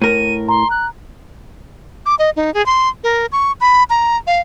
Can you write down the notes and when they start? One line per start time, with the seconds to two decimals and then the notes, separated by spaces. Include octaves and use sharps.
0.02 A2 A#4 D#7
0.49 A#5 C6
0.71 F#6
2.06 D6
2.19 D#5
2.36 D#4
2.54 G#4
2.66 C6
3.04 A#4
3.32 C#6
3.61 B5
3.90 A#5
4.27 F5